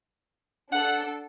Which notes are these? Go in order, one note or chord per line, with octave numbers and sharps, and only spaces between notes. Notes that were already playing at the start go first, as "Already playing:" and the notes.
D4 A4 F#5